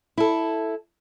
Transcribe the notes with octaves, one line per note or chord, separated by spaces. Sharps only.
E4 A4